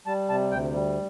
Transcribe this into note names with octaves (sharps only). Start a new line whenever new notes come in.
G3 A5
C3 A5
D2 G5
G3